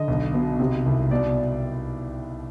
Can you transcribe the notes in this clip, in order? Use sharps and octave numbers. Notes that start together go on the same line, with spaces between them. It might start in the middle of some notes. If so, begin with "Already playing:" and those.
Already playing: D3 D#5
B1
B2
C3
C2
B2 D5